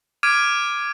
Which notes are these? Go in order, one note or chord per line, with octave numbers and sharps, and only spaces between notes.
D6 F6 G#6 D7 D#7